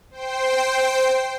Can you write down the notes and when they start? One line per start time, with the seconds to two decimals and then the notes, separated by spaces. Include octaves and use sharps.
0.11 C5 G5 C7